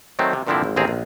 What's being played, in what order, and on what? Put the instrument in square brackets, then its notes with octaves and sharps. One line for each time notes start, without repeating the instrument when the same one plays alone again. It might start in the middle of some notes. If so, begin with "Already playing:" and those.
[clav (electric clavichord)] D#3 F#3 A3 C4
C3
G2 A#2 D3 F3 C4 E4
G#1
A1 D#2 C4 G#4 A#5
A#1